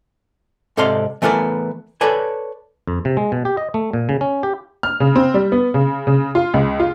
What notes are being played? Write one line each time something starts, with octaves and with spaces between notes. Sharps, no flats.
G#2 C3 A4 D5 F5 C6
E3 A3 B3 A#4 D5
A4 B4 C#5 D5 G#5
F2
C3
G#3
B2
G4
D#5
A3
A#2
C#3
C#4
G4
F6
C#3
C4
G3
B3
C#3
C#3
F4
C#2
F4